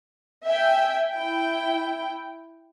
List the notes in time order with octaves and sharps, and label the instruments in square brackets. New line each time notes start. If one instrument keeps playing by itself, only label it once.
[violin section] E5 G5 G#5
E4 G5